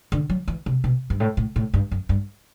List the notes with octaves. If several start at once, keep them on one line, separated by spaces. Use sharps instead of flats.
D3
F#3
E3
C3
B2
G2
A2
A2
A2
G2
F#2
G2